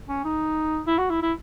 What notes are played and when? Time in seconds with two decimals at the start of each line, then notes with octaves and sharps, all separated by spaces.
0.09 C#4
0.24 D#4
0.87 E4
0.98 F#4
1.10 E4
1.22 E4